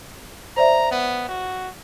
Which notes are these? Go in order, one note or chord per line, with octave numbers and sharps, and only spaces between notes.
C5 D5 E5 A#5
B3
F#4